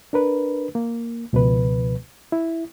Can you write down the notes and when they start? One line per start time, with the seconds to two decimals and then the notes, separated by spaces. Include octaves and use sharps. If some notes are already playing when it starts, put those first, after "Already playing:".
0.13 D4 A#4 B4
0.75 A#3
1.33 C#2 B2 F3 B4
2.32 E4